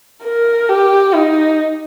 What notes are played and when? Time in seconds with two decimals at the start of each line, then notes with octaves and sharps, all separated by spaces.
0.24 A#4
0.69 G4
1.14 D#4